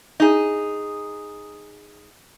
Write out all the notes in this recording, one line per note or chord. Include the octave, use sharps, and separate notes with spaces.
D#4 G#4